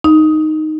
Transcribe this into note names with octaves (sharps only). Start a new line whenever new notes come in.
D#4